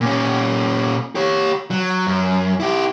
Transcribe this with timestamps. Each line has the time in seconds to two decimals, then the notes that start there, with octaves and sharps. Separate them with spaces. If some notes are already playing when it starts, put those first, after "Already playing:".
0.01 A#2 C#4
1.15 G4 C#5
1.71 F#3
2.07 F#2
2.60 E4 G4